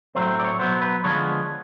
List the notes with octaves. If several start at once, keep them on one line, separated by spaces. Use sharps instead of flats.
A2 F#3 A3 C4 C5
D5
C#5
B2 F#3 B3 C5
B4
D3 F3 G#3 B3 C#5